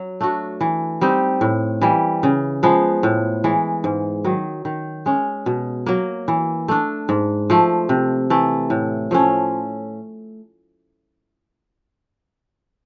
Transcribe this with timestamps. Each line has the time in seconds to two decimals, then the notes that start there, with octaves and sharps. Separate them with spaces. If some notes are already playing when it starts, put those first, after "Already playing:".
Already playing: F#3
0.21 A3 D4 F#4
0.61 E3
1.01 G3 C4 D#4
1.41 A2
1.81 E3 G3
2.23 C#3
2.63 F3 G#3 B3
3.03 A2
3.44 E3 G#3
3.84 G#2
4.25 D#3 F#3
4.65 D#3
5.06 G#3 C#4
5.46 B2
5.86 F#3 A#3
6.28 E3
6.68 A3 D4
7.09 G#2
7.50 F3 A3
7.89 C3
8.30 E3 A3
8.70 A2
9.11 F3 A3 C#4